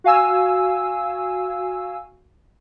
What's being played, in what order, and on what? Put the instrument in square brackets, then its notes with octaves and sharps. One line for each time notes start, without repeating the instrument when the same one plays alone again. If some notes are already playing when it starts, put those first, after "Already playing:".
[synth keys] F#4 F5 G#5 E6